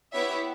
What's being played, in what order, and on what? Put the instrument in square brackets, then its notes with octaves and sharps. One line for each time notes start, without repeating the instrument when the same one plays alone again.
[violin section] B3 E4 G4 C#5 E5